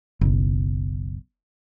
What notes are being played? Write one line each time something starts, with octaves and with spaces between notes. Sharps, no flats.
F#1 B1